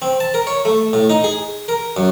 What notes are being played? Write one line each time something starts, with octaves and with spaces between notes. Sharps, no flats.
C4
A5
A#4
C#5
A3
A2
D#4
G#4
A#4
F#2